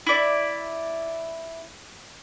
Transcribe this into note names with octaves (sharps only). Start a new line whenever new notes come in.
E4 D5